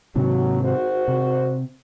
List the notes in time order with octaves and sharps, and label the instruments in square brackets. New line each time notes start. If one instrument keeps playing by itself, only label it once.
[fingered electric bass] G#2 C3 D#3 [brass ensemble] F#3
[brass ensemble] G#1 F#4 C5
[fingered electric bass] C3